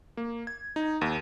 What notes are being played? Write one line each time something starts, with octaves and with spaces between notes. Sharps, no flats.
A#3
G#6
D#4
D#2